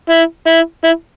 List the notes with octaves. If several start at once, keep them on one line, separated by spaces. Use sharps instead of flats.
E4
E4
E4